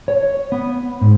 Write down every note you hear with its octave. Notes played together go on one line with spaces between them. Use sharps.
C#5
B3
G#2